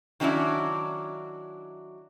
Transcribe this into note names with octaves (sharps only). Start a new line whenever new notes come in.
D#3 F#3 C#4 D4 E4